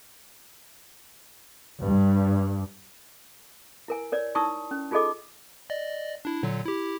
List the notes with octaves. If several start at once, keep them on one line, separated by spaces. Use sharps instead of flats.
G2
E4 A#4 G#5
A#4 C#5 D5
D#4 E4 A5 C#6 D#6 E6
C#4
D#4 F4 G#4 A4 D#5 D6
D5 D#5
D4 E4
A#2 D3 F#3
E4 G4